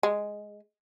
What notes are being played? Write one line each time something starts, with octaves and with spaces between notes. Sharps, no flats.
G#3